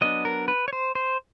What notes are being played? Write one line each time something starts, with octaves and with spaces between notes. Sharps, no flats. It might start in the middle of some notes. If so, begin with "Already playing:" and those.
F#3 B3 D4 D#5
A#4
B4
C#5
C5
C5